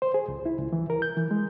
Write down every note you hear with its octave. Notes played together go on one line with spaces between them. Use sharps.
C5
G#4
C#2
E4
C#2
E3
A#4
G6
E3
G#3